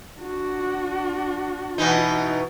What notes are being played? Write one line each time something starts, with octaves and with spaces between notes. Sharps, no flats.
D4 F#4
B2 E3 D#4